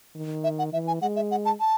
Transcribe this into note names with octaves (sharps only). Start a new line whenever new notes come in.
D#3
E5
F#5
E3 E5
G#5
G#3 F#5
E5
F#5
A5
A5